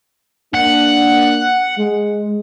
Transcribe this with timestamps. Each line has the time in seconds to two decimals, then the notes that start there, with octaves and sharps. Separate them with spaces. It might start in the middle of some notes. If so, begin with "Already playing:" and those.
0.54 A#3 D4 F#5
1.78 G#3